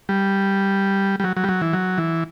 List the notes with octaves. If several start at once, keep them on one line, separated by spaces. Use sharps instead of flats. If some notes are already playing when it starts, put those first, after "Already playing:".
G3
G3
F#3
F#3
G3
F#3
E3
F#3
E3